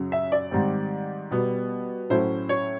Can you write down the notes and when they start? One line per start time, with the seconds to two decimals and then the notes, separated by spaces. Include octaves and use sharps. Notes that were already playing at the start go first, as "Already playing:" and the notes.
Already playing: F#2 C#3 F#3
0.12 E5
0.32 D5
0.51 G#2 D#3 G3 C4
1.31 B2 G3 B3
2.10 A2 F#3 A3 C#4 E4 C5
2.49 C#5